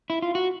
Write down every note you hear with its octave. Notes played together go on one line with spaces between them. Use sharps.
E4
F4
F#4